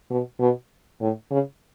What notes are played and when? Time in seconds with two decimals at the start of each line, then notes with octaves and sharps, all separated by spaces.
0.10 B2
0.40 B2
1.01 A2
1.31 C#3